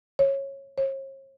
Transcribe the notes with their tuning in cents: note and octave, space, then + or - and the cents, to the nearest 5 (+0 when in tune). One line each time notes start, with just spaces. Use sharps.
C#5 -15
C#5 -45